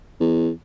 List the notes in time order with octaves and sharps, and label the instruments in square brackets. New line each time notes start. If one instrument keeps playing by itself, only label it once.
[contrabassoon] E2